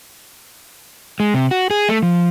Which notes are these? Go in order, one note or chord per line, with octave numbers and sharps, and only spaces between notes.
G#3
C3
F#4
G#4
A3
F3